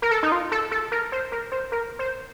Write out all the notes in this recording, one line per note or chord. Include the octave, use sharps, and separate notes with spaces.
A#4
A4
D#4
F4
A4
A4
A#4
C5
A#4
C5
A#4
C5